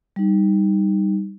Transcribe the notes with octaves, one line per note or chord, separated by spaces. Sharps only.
G3 D#4